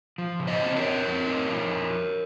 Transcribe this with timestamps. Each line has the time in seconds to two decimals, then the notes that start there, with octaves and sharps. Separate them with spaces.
0.18 F3
0.40 C#3
0.47 C5 D#5
0.62 C4
0.76 A#4 C#5
0.83 C4
1.05 C4
1.27 D#4
1.48 F3